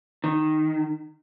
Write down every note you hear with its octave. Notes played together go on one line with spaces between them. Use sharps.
D#3